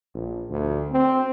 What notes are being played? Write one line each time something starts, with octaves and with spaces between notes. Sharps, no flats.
A#1
D2
C4